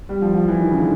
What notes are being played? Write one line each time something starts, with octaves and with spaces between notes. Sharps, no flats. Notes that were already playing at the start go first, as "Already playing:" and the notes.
G3
F3
F3
E3
D#3
C#3
D3